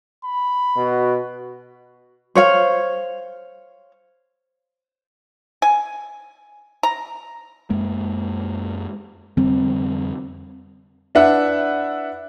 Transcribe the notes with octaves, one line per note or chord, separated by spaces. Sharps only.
B5
B2 F#4
C5 C#5 F5
G#5
A#5
F#2 G#3 A#3
F2 D3 G3 C4
D4 E4 B4 E5 F#5